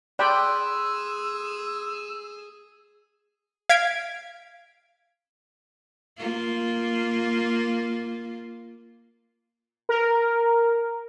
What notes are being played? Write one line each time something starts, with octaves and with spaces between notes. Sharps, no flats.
G#4 D5 G5 B5 C6 E6 F#6
F5 G#6 B6 D7
A#3 F4
A#4